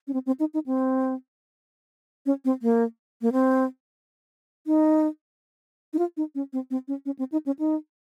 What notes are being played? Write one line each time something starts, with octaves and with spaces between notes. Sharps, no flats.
C#4
C4
C4
D#4
D#4
C4
C#4
C4
A#3
A#3
C4
D#4
D#4
F4
D#4
C#4
C4
C4
C#4
C#4
C4
D#4
C#4
D#4